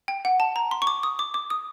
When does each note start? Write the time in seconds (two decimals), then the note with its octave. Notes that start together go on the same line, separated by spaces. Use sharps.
0.08 G5
0.25 F#5
0.40 A5
0.56 A#5
0.71 C6
0.82 C#6
0.87 D6
1.03 D#6
1.19 D6
1.34 D6
1.50 D#6